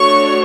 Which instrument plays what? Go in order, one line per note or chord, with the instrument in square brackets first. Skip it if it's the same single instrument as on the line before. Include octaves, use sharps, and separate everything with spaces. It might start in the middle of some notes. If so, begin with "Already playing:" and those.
Already playing: [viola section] A3 D4 F#4 C#5 [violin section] C#6